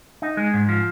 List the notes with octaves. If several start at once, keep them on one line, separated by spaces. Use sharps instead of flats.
D#4
G#3
G#2
F3